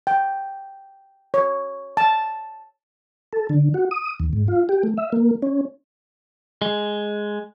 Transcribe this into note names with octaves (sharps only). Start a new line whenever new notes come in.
G5
C#5
A5
A4
D3
F#4
D#6
D#2
G#2
F4
G4
A3
E5
A#3
C#4
G#3